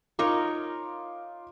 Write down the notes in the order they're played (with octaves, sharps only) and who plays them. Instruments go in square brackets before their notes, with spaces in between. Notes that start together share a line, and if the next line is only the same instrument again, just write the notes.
[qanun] D#4 A#4 C#5 [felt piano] F4 D6